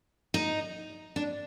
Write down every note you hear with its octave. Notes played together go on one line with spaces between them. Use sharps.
D#4
D4